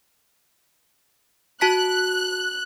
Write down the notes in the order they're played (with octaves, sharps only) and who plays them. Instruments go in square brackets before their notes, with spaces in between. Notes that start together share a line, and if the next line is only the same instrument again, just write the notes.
[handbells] F#4 A5 B6 [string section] F#6